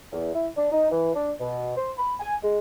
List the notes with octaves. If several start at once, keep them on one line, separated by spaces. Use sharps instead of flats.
E2
E4
D4
D#4
E3
D4
B2
C5
B5
G#5
G#3